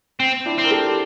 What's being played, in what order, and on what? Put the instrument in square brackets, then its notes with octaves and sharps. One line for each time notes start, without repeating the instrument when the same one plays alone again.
[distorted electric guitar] C4
[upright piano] D4 E4
[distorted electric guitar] C4
[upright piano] A#4
G4 A4